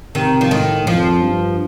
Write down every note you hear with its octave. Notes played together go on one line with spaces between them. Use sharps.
C3 D#3
F3
A2 D#3
F2 F3
G2